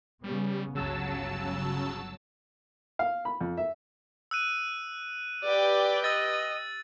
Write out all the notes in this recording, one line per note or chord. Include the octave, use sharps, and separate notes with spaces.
C#3 G3 B3 C#4
G1 C#2 C#3 F#3 A5 E6
F5
B5
F2
E5
E6 F#6 D#7
G4 B4 D5 G5
D#5 E6 A6